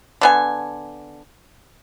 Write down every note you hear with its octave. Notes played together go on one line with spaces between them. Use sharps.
D3 B3 G#5